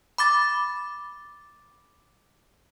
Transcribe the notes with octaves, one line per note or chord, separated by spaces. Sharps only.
B5 D6 A6